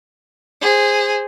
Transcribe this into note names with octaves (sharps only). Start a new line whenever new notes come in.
G#4 C5